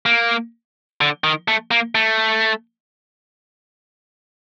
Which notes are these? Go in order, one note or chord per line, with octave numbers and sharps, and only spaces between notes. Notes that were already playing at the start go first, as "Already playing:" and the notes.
A#3
D3
D#3
A3
A#3
A3